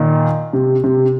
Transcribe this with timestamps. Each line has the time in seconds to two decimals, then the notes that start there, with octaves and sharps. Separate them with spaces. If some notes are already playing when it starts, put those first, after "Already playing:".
Already playing: A#2 D#3
0.53 C3
0.84 C3